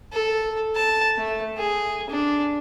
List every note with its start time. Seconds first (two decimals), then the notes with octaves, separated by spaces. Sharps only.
0.12 A4
0.76 A5
1.17 A3
1.57 G#4
2.10 D4